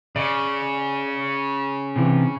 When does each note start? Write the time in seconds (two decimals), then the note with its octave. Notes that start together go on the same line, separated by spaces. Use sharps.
0.16 C#3 D5
1.96 C3 E3